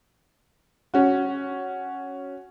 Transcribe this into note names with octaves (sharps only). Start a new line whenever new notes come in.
C#4 F#4